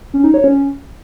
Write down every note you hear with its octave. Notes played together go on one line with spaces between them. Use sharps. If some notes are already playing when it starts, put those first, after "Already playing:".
C#4
D#4
C#5
C#4